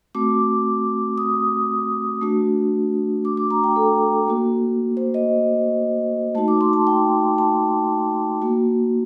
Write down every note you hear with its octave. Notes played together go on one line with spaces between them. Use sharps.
A3 C4 F#4 D6
D#6
A3 D4 F#4
D6
D6
A#5
G5
A4
A#3 F#4
C5
D#5
A3 D#4 F#4 A5
D6
C6
A5
G5
A5
A#3 F#4